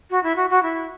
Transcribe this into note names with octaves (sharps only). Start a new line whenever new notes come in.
F#4
E4
F#4
F#4
E4